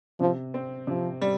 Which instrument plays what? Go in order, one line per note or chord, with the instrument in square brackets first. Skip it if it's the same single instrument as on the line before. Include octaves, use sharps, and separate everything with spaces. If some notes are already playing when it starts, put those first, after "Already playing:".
[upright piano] C3 [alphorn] F3
[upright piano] C4
[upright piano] C3 [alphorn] F3
[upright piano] G3